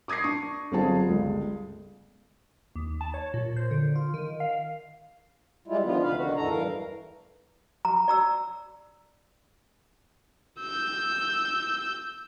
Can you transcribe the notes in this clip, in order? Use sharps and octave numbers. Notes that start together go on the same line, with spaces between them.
D6 D#6 G#6 A#6 C7
D4 C#6
G1 F#3 C4 F4 G#4 A5
G1 C#2
D#2
A5
C#5
A#2
C5
D3
F4
D#3
F5
G3 G#3 E4 F4
D3 D#3 F3 B3 F4
D2 C3 B4 F5
D3 D#3 F#4
E2 A2 E3 A4 A#5
G2 E3 A#4 F5
A#5
D5 A#5 E6
E6 G6